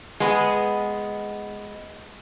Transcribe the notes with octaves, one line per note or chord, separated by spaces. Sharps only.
G#3 B3